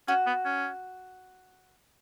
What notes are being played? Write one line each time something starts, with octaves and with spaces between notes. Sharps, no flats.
C#4 F#4
B3
C#4